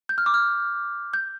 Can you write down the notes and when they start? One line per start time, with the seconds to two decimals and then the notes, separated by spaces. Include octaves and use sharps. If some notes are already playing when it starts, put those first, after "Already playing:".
0.09 G6
0.18 F6
0.26 D6
0.34 F6
1.14 G6